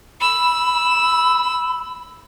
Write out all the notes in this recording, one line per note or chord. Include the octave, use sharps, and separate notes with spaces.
B5 E6